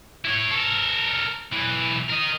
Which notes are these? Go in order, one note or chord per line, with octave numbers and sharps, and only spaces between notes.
E4 C#5
A4 A#4
B1 E3
A#4 D#5